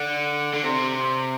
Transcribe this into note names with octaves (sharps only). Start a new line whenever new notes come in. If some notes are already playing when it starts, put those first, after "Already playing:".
Already playing: D3
D3
C3